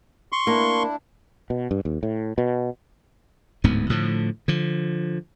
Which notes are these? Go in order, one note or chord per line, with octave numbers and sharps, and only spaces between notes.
C6 C#6
A#3 D4 E4
B2
G2
D#2
A2
B2
D1 D2 G#2 B3
A2 D3 F3
D3 F3